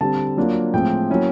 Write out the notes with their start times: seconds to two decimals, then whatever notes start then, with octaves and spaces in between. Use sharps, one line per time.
0.01 D3 G3 C4 A5
0.37 F#3 A#3 D4 F4
0.74 A2 F3 G#3 C4 G5
1.10 F#3 A#3 C#4 E4